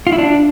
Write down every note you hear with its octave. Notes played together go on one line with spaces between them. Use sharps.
F4
E4
D4